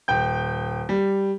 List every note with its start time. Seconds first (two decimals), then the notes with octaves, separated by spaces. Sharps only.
0.08 D#1 G5 G6
0.89 G3